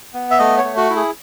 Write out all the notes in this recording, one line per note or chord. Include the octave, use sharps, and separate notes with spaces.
B3
E5
A3 D#5
C#5
A3
F#4
E4
G#4